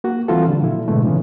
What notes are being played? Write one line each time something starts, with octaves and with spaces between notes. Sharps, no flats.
A#3 F#4
E3 G3 C4 F4 F#4 A4
D3 G3
A#2 F3 E4
G#2 B2 D3 G#3 A3
C#3 E3 B3 C#4